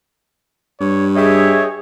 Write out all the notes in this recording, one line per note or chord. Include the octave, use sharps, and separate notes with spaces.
G2 C#5
G4 G#4 C#5 D#5 E5